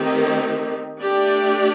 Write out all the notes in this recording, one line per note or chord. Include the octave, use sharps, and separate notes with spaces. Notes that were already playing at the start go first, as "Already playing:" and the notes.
Already playing: D#3 A3 C4 D#4 G4
A3 D4 G4 D5